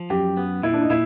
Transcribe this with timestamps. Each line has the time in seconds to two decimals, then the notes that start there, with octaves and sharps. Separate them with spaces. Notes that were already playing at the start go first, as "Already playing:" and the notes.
Already playing: F3
0.10 F#2 G4
0.37 B3
0.63 A#2 E4
0.74 D4
0.82 D#4
0.90 A#2 E4